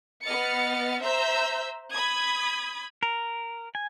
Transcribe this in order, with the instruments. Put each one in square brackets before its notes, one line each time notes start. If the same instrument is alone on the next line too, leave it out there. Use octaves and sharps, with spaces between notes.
[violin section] B3 D#5 F6 A6 C#7
C5 E5 A#5 E6 G6
B5 D#6 G#6
[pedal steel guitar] A#4
G#5